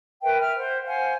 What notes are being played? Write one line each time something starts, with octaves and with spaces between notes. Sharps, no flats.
A#4 B4 E5 G5
E5 F6
C5 F#5
C5 F5 F#5 G#5